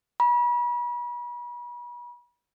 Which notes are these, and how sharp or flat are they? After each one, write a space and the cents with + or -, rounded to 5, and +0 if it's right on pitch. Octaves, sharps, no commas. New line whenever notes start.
B5 -40